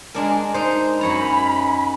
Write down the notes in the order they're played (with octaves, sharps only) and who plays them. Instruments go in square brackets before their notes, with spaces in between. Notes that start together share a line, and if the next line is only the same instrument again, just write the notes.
[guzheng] G#3 D4 A#4
D#4 C5
[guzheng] F#2 C#5 A#5 [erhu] B5